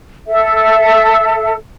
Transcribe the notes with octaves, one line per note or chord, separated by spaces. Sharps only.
A4 E5